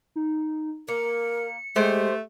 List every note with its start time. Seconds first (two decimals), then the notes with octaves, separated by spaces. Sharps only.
0.16 D#4
0.88 A#3 A#4 C#7
1.76 G#3 A3 G4 C5